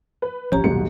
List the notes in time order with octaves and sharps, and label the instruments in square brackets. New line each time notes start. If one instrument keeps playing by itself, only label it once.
[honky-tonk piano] B4
[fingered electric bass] A1 F3 [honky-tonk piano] C#4 [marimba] G4 A#5
[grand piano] D#1 B1 C#7 [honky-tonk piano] G#2 [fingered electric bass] B2 G3 B3